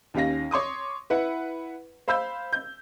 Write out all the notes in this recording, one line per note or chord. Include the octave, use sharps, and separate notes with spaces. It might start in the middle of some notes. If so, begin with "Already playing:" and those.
D#2 C#4 G4 F5 A#6
C#5 C6 D6 D#6
E4 B4 F#5
C5 F5 B5 E6 G6
G6